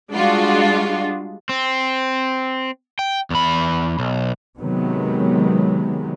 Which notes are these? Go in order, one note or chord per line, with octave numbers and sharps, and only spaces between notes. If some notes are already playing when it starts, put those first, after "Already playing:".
G3 G#3 D4 F4 F#4
C4
G5
E2 B5
B1
C3 D#3 F#3 G#3 B3